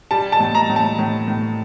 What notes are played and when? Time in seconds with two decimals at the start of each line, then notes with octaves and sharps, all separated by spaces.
0.11 G3 A5
0.32 A5
0.40 A2
0.55 A#5
0.69 A2
0.76 A5
0.99 A2
1.28 A2